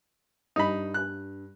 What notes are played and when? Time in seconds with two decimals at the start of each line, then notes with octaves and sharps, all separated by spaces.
0.56 G2 D#4 B5
0.94 F#6